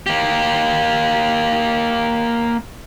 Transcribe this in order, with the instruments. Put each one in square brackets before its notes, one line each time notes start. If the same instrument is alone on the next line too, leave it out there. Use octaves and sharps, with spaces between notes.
[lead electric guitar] A#3 G4